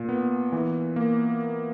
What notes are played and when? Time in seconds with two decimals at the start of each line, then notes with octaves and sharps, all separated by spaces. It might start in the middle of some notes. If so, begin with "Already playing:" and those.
Already playing: A#2
0.09 B3
0.52 E3
0.96 A#3